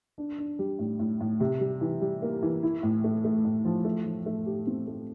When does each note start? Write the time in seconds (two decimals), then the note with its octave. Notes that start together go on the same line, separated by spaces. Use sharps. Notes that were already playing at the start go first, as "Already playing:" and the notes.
0.18 D4
0.38 D4
0.59 G3
0.79 A2
0.99 A2
1.21 A2
1.40 C3
1.61 G3
1.81 E3
2.01 G3
2.22 A#3
2.42 E3
2.63 E4
2.83 A2
3.04 A3
3.24 A3
3.45 A2
3.65 F3
3.85 A3
4.05 F3
4.26 A3
4.46 G4
4.67 C4
4.87 A3